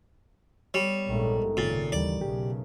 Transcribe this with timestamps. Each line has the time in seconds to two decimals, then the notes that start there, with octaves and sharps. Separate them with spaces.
0.74 G3 B3 C#5
1.07 A#1 G#2 D3 D#3 A3
1.57 G#1 F#2 A#2 C#3 A6
1.92 D#2 E3 G3 D5
2.21 B1 C#3 G4